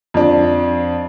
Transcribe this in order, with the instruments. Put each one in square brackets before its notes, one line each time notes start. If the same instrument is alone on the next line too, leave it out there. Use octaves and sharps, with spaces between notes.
[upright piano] F2 D4